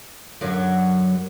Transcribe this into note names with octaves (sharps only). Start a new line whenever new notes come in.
F#2 D3 F#3